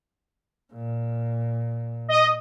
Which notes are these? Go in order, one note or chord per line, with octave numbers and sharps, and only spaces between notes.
A#2
D#5